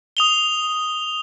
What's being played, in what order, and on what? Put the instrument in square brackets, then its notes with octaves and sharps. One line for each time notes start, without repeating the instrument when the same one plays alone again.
[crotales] D#6 F7 G7